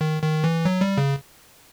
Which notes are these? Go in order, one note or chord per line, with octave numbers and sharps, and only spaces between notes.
D#3
D#3
E3
F#3
G3
C#3